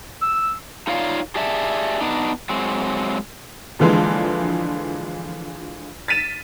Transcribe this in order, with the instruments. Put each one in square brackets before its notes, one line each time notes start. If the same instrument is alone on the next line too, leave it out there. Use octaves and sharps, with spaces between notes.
[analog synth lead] E6
[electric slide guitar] D#4 F4 C#5 D5 F5
G4 G#4 D5 E5 A5
B3 D4 D#4
F#3 G#3 C4
[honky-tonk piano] A#1 D3 E3 F3 G#3
A6 B6 D#7 E7